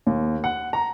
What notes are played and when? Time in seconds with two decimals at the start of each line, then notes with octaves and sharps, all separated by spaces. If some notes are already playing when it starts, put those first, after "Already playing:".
0.07 D#2
0.44 F#5
0.73 A#5